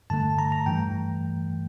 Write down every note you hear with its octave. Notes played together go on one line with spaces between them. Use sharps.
G2 D3 A3 A5
A#5
A#5
G2 E3 A3 G5